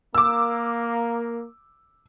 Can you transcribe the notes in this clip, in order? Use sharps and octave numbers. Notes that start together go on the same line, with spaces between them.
A#3 D6 E6